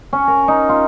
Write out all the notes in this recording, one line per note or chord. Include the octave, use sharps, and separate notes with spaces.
C#4
A#4
D#4
F4